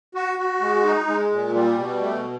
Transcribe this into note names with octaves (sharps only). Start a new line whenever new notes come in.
F#4
F#4
G#3
D#4
G#3
A#2
G3
B2
A3